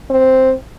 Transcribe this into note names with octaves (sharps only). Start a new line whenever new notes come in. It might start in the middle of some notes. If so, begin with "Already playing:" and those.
C4